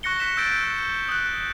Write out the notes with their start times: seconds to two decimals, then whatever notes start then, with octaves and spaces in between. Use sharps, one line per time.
0.03 C#6 F#6 A#6 C#7 G7
0.20 F#6 B6 E7
0.37 E6 G6 A6 D7
0.64 F#6
1.08 D#6 F#6